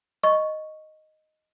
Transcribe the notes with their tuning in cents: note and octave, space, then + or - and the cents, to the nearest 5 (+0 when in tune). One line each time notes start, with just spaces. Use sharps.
D#5 -5 C#6 +0